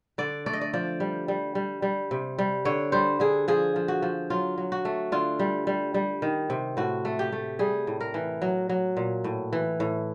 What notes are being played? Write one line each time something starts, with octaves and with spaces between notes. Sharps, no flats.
D3 D5
A3 D5
D#5
D5
F3 D5
G3
G3
G3
G3
C3
G3
D3 C#5
G3 C5
D3 G#4
F3 G#4
F3
F#4
F3
F#3 F4
F#3
F#4
A3
D3 F4
G3
G3
G3
D#3
C3
A2 F#4
A3
G4
A3
G3 G#4
A2
A#4
E3
F#3
F#3
A#2
A2
E3
A2